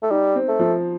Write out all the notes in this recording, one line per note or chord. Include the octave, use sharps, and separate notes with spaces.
A3
G3 D#4
C4
A3
F3